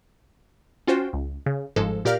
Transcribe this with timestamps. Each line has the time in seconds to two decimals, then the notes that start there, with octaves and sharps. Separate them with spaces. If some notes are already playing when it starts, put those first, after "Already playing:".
0.87 C#4 F4 F#4 C5 G5
1.13 C#2
1.46 C#3
1.76 G1 G#2 F3 G#3 A4
2.05 A#2 G4 A#4 D5 F5 F6